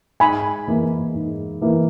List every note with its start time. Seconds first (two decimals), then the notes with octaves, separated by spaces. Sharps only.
0.20 G#2 G#5 B5
0.67 E3 A#3 E4
1.15 G#2
1.61 E3 A#3 E4